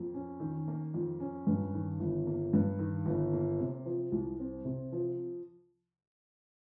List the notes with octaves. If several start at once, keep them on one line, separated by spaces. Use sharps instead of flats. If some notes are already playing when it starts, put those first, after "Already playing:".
Already playing: F2 A#3
C#4
D#3
A#3
F2
C#4
G2
D#3
G1
A#3
G2
D#3
G1
A#3
C3
F3
C2
C4
C3
F3